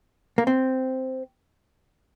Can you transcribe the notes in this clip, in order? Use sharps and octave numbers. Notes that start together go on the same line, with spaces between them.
A#3
C4